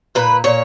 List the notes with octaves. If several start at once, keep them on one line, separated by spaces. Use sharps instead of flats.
A#2 B4
A#2 C#5